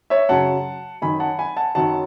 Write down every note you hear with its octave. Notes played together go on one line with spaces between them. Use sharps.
C#5 E5
F#2 C#3 F#3 F#5 A5
F#2 D#3 F#3 G#5 B5
F#5 A5
G#5 B5
F#5 A5
F#2 D#3 F#3 F#5 A5